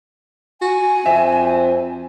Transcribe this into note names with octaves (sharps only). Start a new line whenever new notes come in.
F#4 G#5
F2 C4 E5